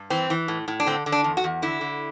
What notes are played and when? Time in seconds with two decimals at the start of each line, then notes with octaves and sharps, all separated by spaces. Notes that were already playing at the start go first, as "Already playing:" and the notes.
Already playing: G2
0.10 E3 C4
0.30 E3
0.48 A2
0.68 A2
0.80 D4
0.86 D3 C4
1.06 D3
1.12 D4
1.24 E2
1.37 F#4
1.44 E2
1.62 D3 E4
1.81 D3